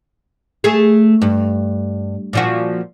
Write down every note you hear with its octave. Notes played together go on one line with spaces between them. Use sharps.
A3 G#4
G2
A#2 F3 F#4